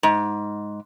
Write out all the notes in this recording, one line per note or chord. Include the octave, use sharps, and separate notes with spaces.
G#2